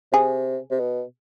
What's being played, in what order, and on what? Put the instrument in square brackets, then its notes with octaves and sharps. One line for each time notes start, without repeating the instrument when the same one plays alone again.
[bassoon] C3 [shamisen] G#4
[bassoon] C3
B2